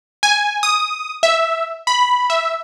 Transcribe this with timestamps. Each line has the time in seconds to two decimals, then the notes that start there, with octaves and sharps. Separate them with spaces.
0.23 G#5
0.63 D#6
1.23 E5
1.87 B5
2.30 E5